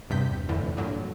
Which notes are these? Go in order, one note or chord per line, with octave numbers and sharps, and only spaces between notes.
E2 G2 C3 G6 B6
F2 A2 D3 E3
G2 A#2 D3 F#3